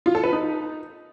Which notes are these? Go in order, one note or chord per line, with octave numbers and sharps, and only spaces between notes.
F4
A4
B4
D#4